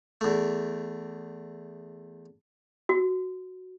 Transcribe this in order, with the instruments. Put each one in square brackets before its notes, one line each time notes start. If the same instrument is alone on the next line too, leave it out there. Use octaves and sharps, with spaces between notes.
[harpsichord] E2 A3
[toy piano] F#4